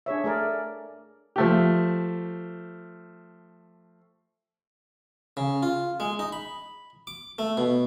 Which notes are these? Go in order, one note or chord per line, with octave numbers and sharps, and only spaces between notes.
D4 G#4 C#5 E5
A3 G#4 A#4 D5
F3 A3 G4
C#3
F4
G#3
D#4
B5
D6
A3
B2